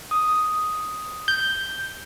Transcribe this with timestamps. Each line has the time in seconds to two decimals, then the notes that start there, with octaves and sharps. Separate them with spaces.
0.11 D#6
1.28 G6